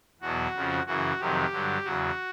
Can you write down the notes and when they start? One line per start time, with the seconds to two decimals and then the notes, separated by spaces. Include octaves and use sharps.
0.21 E2 B2 F#3 F#4
0.54 F2 C#3 F3
0.87 F#2 C#3 E3 F#4
1.19 F2 C3 D#3 F#3 G4
1.52 G2 D3 F#3
1.85 E2 C#3 F#3 F#4